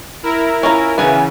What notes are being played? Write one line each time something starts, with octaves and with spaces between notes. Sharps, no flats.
E4 A#4
C#4 F4 A#5
C#3 E3 B3 G#4